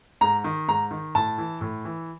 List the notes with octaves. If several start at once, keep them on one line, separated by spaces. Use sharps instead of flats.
G#2 A#5
D#3
G#2 A#5
D#3
A2 A5
E3
A2
E3